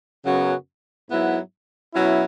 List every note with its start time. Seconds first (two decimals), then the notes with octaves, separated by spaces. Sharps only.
0.25 F#2 C#3 F#3 B3 F#4
1.09 G#2 F#3 B3 E4
1.94 B2 F#3 C#4 E4